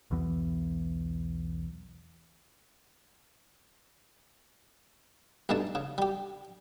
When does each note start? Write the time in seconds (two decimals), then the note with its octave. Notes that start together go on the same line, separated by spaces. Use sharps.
0.11 B1 E2 E3 B3
5.49 B1 G2 G#3 A3 A5
5.75 C#3
5.98 G3 G4